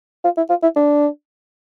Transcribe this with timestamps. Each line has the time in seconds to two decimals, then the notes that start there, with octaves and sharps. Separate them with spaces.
0.24 F4
0.37 E4
0.49 F4
0.63 E4
0.76 D4